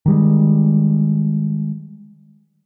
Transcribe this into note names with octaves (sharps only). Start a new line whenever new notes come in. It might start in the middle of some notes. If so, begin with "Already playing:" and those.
D#3 G3 G#3